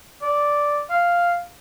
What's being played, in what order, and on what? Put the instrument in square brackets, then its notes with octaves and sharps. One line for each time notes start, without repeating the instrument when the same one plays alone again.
[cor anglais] D5
F5